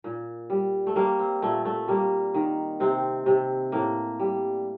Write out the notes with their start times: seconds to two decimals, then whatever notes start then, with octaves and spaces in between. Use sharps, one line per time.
0.04 A#2
0.50 G3
0.87 A3
0.96 G3 A#3
1.19 C4
1.42 A#2 A3
1.65 A3
1.88 G3 A#3
2.34 D#3
2.80 C3 C4
3.26 C3
3.72 A2 A#3
4.19 G3